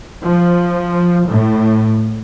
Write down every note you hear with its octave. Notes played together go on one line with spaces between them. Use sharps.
F3
A2